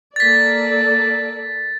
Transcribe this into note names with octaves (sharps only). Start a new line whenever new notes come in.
A#3 A4 D5 A6 B6